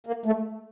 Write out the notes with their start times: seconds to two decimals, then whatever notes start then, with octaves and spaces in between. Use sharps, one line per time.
0.07 A#3
0.26 A3